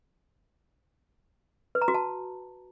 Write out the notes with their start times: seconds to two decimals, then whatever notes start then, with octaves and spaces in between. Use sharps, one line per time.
1.75 B4
1.82 A#5
1.88 F#4
1.95 A5